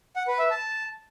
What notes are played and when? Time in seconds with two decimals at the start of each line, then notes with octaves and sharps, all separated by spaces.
0.16 F#5
0.27 B4
0.39 E5
0.50 A5